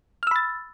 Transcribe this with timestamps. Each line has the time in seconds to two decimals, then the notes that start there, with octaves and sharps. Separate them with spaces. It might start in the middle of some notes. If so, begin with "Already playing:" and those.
0.23 F6
0.27 E6
0.31 B5
0.36 A6